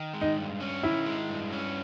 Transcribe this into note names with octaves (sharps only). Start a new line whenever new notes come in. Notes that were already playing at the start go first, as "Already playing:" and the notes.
Already playing: D#3
G#3
D#4
G2
C#4
D#3 E4
G#3
G2
C#4